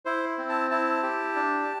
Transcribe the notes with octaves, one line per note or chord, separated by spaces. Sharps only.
E4 C5
C4
A5
E4 A5
G4
D4